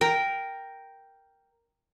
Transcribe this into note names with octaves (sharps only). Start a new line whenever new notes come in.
A#4 G5